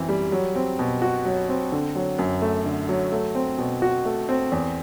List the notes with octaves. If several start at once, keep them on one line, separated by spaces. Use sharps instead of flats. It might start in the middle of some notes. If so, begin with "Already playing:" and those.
Already playing: F#2 E3 C4
G3
F#3
C4
B2
F#4
F#3
C4
D3
F#3
F#2
A3
D3
F#3
A3
C4
B2
F#4
A3
C4
E2